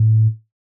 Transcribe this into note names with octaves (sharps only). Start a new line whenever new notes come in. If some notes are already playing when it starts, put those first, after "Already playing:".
Already playing: A2